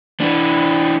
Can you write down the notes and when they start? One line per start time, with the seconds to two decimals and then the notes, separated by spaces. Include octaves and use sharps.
0.20 E3 D4